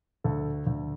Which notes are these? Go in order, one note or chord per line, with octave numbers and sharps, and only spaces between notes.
D2 A4
D2